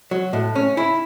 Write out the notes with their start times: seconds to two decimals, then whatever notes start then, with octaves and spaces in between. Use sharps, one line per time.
0.11 F#3
0.33 A2
0.55 C#4
0.77 E4